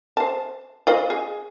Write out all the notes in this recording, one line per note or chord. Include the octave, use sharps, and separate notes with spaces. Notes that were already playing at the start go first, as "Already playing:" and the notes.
C5 A5
F4 C5 D#5
G#4